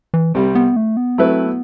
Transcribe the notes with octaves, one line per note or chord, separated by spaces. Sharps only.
E3
C2 C3 G3
B3
A3
B3
F#3 A3 C4 E4 B4
B3